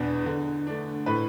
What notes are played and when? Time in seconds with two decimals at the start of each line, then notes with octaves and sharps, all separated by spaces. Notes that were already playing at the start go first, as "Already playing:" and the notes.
Already playing: E2 B2 B3 D4
0.26 D3
0.67 A3 D4
1.06 A2 B4 B5